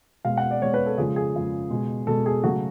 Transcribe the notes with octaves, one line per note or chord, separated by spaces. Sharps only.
B2 G#3 F5
F#5
D5
B2 G#3 C#5
B4
A4
C#3 F3 G#3 G#4
G#4
C#3 F3 G#3
B2 G#3
B2 G#3 A4
G#4
C#3 F#3 A3 F#4